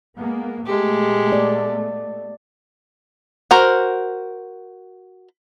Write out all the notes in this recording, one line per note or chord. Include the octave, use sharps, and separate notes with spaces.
G#3 A#3 B3
A#2 G#3 A3 B3 G4
D5
F#4 A#4 C5